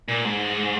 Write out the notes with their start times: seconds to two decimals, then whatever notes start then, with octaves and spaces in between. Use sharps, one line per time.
0.08 A#2
0.25 G#2